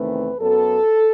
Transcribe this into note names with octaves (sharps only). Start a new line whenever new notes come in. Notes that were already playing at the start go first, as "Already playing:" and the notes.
Already playing: E2 C3 D#3 A3 C4 B4
F#2 F#3 B3 A4